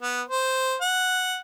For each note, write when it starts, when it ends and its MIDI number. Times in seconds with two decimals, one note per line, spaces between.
0.01 0.22 59
0.29 0.75 72
0.81 1.38 78